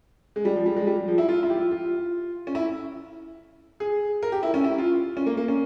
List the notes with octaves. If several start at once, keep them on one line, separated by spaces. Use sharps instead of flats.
G#3
G3
F3
G3
G#3
G3
F3
E4
F4
E4
G4
F4
F4
C#4
E4
G#4
A#4
G4
E4
C#4
E4
F4
C#4
A#3
A#3
C#4